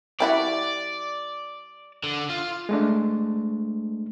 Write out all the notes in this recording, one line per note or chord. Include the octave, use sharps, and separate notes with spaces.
G3 E4 F#4 D5
D3
F4
G#3 A3 D4